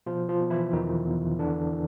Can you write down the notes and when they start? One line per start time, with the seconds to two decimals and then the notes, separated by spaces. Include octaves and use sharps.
0.06 B2 F3 F4
0.29 F3 F4
0.40 B2
0.50 E3 E4
0.72 E2 D#3 D#4
1.06 E2
1.39 D3 E3 D4
1.72 E3